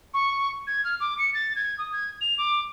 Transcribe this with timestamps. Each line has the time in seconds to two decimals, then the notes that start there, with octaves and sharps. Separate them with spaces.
0.14 C#6
0.67 G#6
0.84 F6
1.00 D6
1.18 C#7
1.34 A6
1.56 G#6
1.78 D#6
1.92 G#6
2.21 F7
2.38 D6